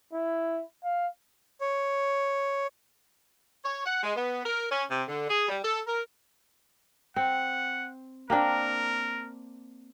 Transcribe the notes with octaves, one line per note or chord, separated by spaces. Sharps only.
E4
F5
C#5
C#5
F#5
G#3
B3
A#4
C#4
C3
D3
G#4
G3
A4
A#4
C4 F#5
A#3 C4 D4 A#4